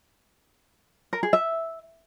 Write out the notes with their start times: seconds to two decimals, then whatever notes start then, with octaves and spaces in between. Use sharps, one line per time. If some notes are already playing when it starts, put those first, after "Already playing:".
1.13 A#4
1.23 G#4
1.33 E5